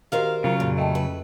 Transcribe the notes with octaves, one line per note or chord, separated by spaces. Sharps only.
D#3 F#4 G4 A#4 C5 F5
C#3 F#3 F4
F2 A#2
A3 D#5 G5 A5
C#4 B4